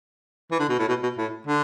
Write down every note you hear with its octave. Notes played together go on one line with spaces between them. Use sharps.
E3
D3
B2
A2
B2
B2
A2
D3